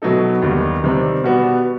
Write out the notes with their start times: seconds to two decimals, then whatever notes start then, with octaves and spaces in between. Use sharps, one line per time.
0.02 B2 F#3 B3 D#4 A4
0.42 D#2 D#3 G3 B3
0.84 C3 D#3 G3 C4
1.24 B2 G3 B3 F#4